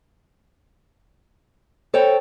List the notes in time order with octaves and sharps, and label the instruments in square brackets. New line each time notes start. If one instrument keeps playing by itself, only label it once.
[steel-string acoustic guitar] A4 C#5 G5 [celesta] C5